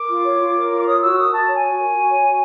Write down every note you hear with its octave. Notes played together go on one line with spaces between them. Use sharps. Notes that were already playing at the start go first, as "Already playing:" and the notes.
Already playing: A#4 D6
F4
C#5
F4
A#4
F4
D6
C#5 D#6
F#4 E6
A#4 D#6
F#4 A5
C#5
G#5
F#4
A#4
F#4
C#5
F#4